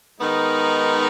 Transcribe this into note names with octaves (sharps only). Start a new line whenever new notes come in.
D#3 G#3 B3 D#4